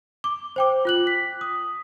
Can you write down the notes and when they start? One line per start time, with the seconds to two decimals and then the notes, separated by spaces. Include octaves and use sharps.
0.24 D6
0.56 C5 G5 D6
0.85 F4 F#6 F#7
1.07 B6
1.41 D#6